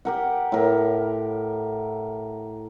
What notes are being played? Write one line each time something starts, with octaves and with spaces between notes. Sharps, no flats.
G4 A#4 F#5
A2 A#4